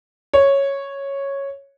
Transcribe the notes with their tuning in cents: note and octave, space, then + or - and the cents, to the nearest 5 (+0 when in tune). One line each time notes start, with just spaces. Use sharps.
C#5 -5